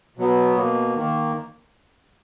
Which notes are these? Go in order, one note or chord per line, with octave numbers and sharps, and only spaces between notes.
B2 F#3 B3
B2 A#3
D#3 A#3